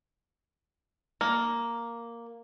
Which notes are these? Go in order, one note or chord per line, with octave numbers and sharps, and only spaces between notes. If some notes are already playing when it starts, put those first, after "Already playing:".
A#3